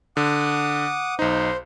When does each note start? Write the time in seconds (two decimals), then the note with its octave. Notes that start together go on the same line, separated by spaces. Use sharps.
0.17 D3 F#5 D6 D#6
1.19 B1 D#4 C5